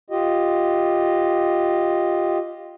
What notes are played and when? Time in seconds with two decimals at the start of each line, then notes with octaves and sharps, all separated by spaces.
0.10 F4 G4 D#5